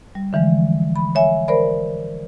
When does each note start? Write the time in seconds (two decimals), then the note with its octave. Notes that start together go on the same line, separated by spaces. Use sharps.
0.15 G3
0.33 D3 E3 F3 G#3
0.96 B5
1.15 C#5 E5 G#5
1.48 A#4 C5 D5 B5